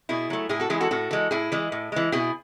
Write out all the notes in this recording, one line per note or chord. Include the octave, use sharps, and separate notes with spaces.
B2 E4 G#4
F#3 A3
A2 E4 G#4
F#4 A4
E3 G#3 E4 G#4
F#4 A4
A2 F#4 A4
E3 G#3
A2 E4 G#4
E3 G#3
A2
E3 G#3
B2 E4 G#4